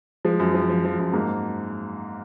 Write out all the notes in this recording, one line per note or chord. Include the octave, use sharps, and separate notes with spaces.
F3 G#3
F#2
F3
F3
F3
F#2
G#2 A#3